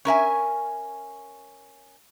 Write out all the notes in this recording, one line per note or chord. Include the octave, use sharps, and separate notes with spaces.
C#4 A#4 E5 G#5